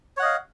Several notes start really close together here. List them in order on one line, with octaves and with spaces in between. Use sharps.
C#5 F#5 D#5 F5